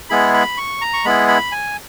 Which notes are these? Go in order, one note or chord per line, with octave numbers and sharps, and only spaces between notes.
G#3 B3 E4 G#4 B5
B5
C#6
A#5
C#6
G#3 B3 E4 G#4 B5
B5
G#5